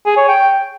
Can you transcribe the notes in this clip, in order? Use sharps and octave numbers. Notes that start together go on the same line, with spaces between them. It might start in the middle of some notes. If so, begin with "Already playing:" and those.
G#4
C#5
G5